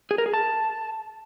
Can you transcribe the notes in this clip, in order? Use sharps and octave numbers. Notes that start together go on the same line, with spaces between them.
G#4
A#4
G#4
A5